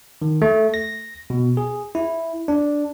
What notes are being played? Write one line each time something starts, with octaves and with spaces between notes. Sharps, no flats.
D#3
A3
A#6
B2
G#4
E4
D4